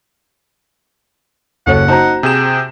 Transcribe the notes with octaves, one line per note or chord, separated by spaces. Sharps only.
F#1 F#4 A4 C#5 F#5
D#4 F#4 C5 A5 A#5
C3 G#4 G5 E7